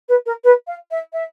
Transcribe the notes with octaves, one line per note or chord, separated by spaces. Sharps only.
B4
A#4
B4
F5
E5
E5